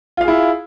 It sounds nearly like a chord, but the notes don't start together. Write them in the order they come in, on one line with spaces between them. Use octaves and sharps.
F4 F5 G#4 E4